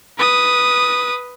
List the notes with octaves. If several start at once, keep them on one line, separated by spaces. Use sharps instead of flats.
B4 D#6